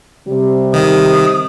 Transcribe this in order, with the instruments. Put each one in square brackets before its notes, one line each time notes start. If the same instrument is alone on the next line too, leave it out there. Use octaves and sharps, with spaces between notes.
[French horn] C3 [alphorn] G3
[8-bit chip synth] D#3 [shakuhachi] D#6